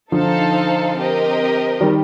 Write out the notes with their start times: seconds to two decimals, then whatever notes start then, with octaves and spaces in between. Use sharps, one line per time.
0.12 D3 F3 D#4 A4 C5 F5 A5
0.96 C4 G4 A#4 D#5
1.80 D#3 G3